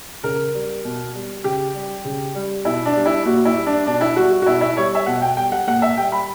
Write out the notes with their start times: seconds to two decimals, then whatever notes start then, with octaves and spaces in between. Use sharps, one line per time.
0.23 C#3 A#4
0.54 G3
0.84 B2
1.15 G3
1.44 C#3 G4
1.74 G3
2.05 C#3
2.35 G3
2.65 B2 E4
2.86 D4
2.96 G3
3.05 E4
3.25 A#2 F#4
3.45 E4
3.56 G3
3.66 D4
3.86 B2 D4
4.01 E4
4.16 G3 F#4
4.31 F#4
4.42 F#4
4.46 B2 E4
4.61 E4
4.77 G3 C#5
4.95 E5
5.06 B2 F#5
5.22 G5
5.37 G3 G5
5.52 F#5
5.67 A#2 F#5
5.82 E5
5.97 G3 G5
6.12 B5